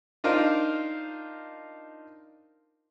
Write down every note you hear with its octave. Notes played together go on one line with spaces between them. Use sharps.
D4 D#4 F4 A#4 C5